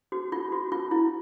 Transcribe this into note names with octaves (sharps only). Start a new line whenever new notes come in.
F#4
F4
F#4
F4
E4